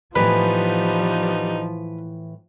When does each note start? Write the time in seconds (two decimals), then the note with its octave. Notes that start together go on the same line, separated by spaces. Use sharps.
0.16 A2 E3 F3 G3 B3 D#4 B4